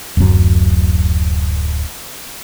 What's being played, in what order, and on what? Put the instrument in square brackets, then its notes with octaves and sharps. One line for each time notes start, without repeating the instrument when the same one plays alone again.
[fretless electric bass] D1 F#2